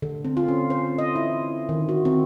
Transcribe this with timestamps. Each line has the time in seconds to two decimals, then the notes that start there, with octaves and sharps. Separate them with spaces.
0.02 D3
0.25 C4
0.37 F4
0.48 C#4
0.70 C5
0.98 D#5
1.16 E4
1.69 D#3
1.89 F#4
2.05 C4